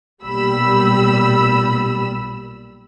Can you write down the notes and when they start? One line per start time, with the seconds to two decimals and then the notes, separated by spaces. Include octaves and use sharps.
0.23 B1 A#2 G3 B5 E6